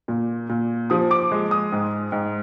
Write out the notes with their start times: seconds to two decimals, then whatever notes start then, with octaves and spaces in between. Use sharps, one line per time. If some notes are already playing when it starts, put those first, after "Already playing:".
0.08 A#2
0.49 A#2
0.90 F3 D#6
1.11 D6
1.31 G#3
1.51 D#6
1.72 G#2
2.12 G#2